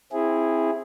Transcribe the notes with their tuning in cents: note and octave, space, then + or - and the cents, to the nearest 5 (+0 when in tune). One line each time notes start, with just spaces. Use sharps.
C4 +15 E4 +0 G#4 -10